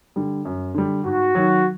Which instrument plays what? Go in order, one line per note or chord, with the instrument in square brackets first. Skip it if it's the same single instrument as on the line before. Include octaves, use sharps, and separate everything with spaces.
[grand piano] D3 G3
F#2
D3 G3
[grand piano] G#2 [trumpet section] F#4
[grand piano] D#3 F#3